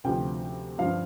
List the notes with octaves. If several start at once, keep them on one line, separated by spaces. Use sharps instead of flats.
D2 C3 F3 G5
G2 F3 F5